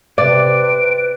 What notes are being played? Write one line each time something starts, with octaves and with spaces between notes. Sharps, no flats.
C3 B4 D5 D7